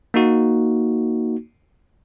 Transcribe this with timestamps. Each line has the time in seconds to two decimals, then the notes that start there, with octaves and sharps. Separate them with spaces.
0.14 A#3 D#4 F#4